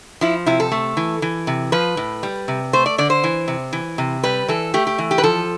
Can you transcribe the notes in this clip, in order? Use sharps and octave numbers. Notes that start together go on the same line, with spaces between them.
F3 E4
C3 E4
A4
A3
E3
E3
C3
F3 B4
A2
G3
C3
A3 C5
D5
D3 D5
C5
E3
C3
E3
C3
G3 B4
E3 A4
A3 G4
G4
E3
G4
B4
F3 A4